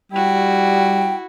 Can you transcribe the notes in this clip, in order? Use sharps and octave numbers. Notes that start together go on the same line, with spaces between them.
G3 E4 F#4 G5